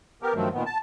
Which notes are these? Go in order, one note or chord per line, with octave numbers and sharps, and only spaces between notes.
B3 G4 A#4
G2 D#3 F3 F#3 A3 C4
A#2 D#3 B3
A5